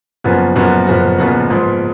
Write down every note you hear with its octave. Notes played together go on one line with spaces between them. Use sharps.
F#1 F#2 F3 B3 F#4
F#1 F#2 F3 B3 F#4
F#1 F#2 F3 B3 F#4
F#1 F#2 F3 B3 F#4
G#2 F3 B3